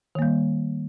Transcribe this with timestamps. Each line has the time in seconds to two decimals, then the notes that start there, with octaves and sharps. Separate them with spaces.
0.15 D#3
0.19 A#3
0.22 G3